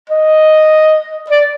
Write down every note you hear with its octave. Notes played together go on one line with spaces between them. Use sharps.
D#5
D5